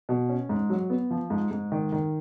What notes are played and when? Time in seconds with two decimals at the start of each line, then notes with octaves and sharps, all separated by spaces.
0.09 B2
0.29 C#4
0.49 G#2
0.70 F#3
0.90 B3
1.11 F3
1.30 G#2
1.51 G#2
1.72 D#3
1.92 D#3